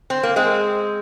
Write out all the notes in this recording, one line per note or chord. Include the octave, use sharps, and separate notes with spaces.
C4
A#3
G#3 C4